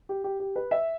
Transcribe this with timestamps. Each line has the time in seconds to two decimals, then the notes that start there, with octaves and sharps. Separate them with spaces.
0.09 G4
0.24 G4
0.40 G4
0.56 B4
0.71 E5